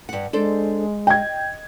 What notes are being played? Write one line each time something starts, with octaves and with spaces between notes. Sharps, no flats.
G2 F#5
G#3 D4 A4 C5
D#5 G5 G#6